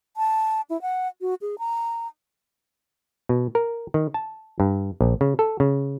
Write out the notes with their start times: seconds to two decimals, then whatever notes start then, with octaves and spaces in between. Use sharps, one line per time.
0.17 A5
0.70 E4
0.82 F#5
1.21 F#4
1.41 G#4
1.59 A#5
3.29 B2
3.55 A#4
3.94 D#3
4.14 A5
4.60 G2
5.01 A#1
5.21 C#3
5.39 A4
5.60 C#3